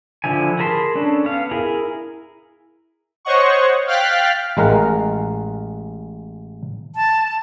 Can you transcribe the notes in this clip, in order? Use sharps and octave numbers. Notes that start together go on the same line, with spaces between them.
D3 F3 E4 G#5
G#4 A#4 A5 B5 C6
C#4 D4 A4
B3 F5
E4 G#4 A#4
C5 C#5 D#5 F#5 C#6
F5 G5 F6 F#6 A6 B6
A1 G#3 A#4 F5 F#5
A5